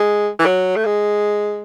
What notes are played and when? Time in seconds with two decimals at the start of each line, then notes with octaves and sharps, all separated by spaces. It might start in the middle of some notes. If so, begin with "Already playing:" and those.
Already playing: G#3
0.39 E3
0.46 F#3
0.76 A3
0.85 G#3